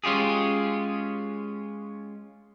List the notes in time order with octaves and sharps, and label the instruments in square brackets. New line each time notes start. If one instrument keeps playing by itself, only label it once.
[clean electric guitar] G#3 C#4 F4 G4 G#4